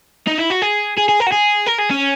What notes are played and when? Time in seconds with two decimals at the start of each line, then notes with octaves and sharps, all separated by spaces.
0.28 D#4
0.38 E4
0.50 F#4
0.62 G#4
0.97 G#4
1.09 G#4
1.20 A#4
1.27 F#4
1.32 G#4
1.67 A#4
1.79 G#4
1.91 C#4